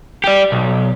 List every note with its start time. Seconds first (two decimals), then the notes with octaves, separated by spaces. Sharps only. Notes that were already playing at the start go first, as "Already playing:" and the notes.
0.24 G4 D5
0.52 B1